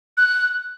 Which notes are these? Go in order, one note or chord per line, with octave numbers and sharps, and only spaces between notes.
F#6